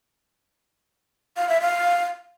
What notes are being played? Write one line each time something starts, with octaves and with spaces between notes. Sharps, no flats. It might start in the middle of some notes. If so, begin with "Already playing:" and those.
F5
E5
F5